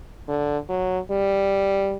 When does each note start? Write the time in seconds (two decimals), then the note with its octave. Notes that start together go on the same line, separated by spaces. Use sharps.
0.28 D3
0.69 F#3
1.11 G3